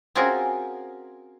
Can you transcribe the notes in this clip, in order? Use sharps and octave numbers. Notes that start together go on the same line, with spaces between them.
C4 C#4 F4 F#4 G#4 A#4